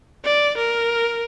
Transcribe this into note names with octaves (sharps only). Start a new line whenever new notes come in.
D5
A#4